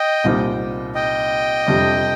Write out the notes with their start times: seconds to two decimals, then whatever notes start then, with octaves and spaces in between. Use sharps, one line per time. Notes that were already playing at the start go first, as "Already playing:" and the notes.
Already playing: D#5 G5
0.24 C2 A#2 G3 C4 D#4
0.95 D#5 G5
1.66 F2 C3 G3 D4